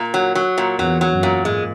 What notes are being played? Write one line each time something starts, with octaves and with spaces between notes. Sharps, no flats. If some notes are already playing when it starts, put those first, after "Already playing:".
Already playing: A#2
F#3
F#3
A#2
E2 F#3
F#3
F#2
A#2
G#2 G#3